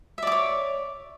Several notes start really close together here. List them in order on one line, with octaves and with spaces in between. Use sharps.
E5 D5 D6 C#5